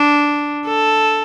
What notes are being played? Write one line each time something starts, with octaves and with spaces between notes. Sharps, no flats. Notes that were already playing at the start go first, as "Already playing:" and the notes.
Already playing: D4
A4